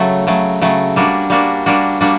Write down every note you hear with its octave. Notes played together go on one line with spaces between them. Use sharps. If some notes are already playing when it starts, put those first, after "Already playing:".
Already playing: C#3 F#3 A3
C#3 F#3 A3
C#3 F#3 A3
G3 A#3 D4 F#4
G3 A#3 D4 F#4
G3 A#3 D4 F#4
G3 A#3 D4 F#4